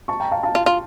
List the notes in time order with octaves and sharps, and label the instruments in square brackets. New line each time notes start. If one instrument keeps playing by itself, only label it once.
[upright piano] A5 C#6
G5 A#5
F5 A5
F5 A5
[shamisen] F4
F4